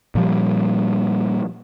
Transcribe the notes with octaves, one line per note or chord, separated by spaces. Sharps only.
A#2 F3 G3